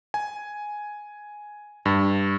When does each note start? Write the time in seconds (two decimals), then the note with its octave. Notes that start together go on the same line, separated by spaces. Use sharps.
0.14 G#5
1.86 G2